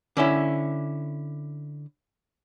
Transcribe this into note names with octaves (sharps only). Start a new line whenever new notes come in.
D3 C#4 E4